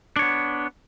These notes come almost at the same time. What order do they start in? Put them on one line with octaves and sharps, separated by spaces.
D4 C#5 B3